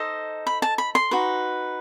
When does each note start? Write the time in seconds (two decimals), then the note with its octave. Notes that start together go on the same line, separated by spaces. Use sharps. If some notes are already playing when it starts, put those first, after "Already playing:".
Already playing: D#4 A4 C5 D#5
0.47 B5
0.62 A5
0.78 B5
0.95 C6
1.11 D#4 F#4 B4